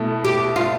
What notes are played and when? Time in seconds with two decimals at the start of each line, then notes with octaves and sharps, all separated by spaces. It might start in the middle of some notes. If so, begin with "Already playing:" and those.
Already playing: B2 A3 E4
0.24 G4
0.56 F4